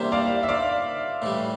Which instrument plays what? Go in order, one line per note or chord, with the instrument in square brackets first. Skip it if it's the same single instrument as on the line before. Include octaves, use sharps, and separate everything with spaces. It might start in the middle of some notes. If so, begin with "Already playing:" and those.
Already playing: [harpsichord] E2 C3 G3 A#3 D4 [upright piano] C5 E5
[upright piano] D5 F5
E5
D5 F5
[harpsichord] A2 E3 G3